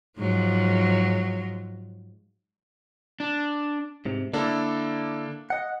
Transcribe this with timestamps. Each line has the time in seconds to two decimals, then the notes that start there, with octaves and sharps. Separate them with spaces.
0.18 G#2 F3 F#3
3.20 D4
4.05 G#2 C3
4.33 D3 A#3 D4 E4 A4
5.50 D#5 F#5